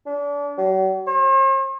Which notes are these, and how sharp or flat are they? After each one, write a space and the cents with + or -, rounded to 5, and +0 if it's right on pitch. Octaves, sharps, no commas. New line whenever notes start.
D4 -35
F#3 +45
C5 +45